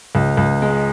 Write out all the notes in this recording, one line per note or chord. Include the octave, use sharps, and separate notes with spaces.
C#2
C#2
G#3